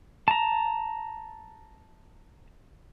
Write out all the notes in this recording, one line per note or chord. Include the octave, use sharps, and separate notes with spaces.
A5 A#5